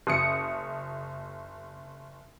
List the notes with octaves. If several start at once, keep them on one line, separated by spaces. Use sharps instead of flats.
F#1 D#6 C#7